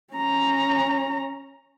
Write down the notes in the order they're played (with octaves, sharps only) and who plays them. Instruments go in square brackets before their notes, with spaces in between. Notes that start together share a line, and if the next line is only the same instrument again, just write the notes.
[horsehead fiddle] C#4 A#5